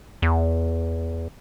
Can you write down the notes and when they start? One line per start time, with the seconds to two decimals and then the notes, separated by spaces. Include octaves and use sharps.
0.22 E2